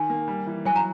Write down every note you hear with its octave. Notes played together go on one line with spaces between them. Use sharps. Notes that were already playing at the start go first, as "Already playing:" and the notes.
Already playing: D#3 G#5
A#3
G3
E3
F#3 G#5
A#5